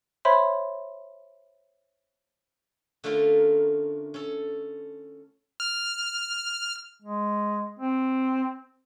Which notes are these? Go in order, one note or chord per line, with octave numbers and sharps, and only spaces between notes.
C5 C#5 E5 B5 C6
D3 A3 C#4 F4 A#4
C#4 A4
F6
G#3
C4